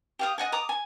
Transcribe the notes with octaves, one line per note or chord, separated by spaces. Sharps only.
G4 F5 D#6
D#5 F#5 G#5
A#5 D6 D#6
G#5